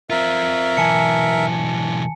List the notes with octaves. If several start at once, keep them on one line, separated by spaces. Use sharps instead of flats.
C4 F4 A#4 E5
B1 E3 G#5 A5 C#7